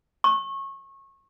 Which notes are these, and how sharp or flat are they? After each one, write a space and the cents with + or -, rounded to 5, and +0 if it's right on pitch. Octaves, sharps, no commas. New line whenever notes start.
C#6 -25